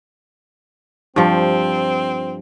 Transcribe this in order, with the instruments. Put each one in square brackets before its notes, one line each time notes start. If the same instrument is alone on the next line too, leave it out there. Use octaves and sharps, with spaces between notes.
[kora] G2 F3 [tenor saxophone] C4